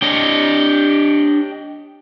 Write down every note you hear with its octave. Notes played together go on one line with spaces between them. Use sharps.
D4 G4 C#5 D#5